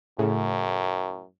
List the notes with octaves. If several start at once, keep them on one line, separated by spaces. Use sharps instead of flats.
F#2 A2 C#3